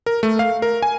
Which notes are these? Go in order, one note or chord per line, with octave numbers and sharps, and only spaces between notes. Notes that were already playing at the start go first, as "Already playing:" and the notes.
A#4
A3
F5
A#4
G#5